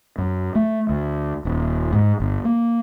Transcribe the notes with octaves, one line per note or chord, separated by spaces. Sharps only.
F#2
A3
D2
D#1
G#2
G1
A#3